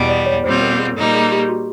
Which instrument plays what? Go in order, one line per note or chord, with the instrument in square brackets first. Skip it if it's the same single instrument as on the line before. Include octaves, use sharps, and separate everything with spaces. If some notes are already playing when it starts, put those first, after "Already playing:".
Already playing: [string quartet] E2 B2 G3
[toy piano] D5
C#5
[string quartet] B2 G3 C4 F4 [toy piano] C5
[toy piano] A#4
G#4
[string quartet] A#2 G3 A#3 D#4 [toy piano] A4
[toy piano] G#4
G4
F#4